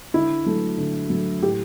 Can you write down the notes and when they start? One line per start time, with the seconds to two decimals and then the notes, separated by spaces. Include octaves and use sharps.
0.14 D3 E4
0.46 F#3 A3
0.78 D3
1.10 F#3 A3
1.42 A2 G4